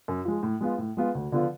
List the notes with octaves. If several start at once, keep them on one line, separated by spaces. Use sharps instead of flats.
F#2
F3 G#3
A2
G#3 B3 F4
A2
G#3 B3 F4
D2
D3 F3 B3 F4